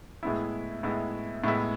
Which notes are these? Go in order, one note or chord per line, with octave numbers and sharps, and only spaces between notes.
A2 G#3 B3 E4
A2 G#3 B3 E4
A2 G#3 B3 E4